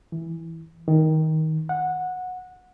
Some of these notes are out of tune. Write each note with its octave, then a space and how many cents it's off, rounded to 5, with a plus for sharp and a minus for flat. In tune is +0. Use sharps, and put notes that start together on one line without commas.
E3 -5
D#3 +15
F#5 -15